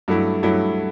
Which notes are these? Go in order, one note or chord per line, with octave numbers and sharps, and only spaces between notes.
G2 F#3 A3 E4
G2 F#3 A3 E4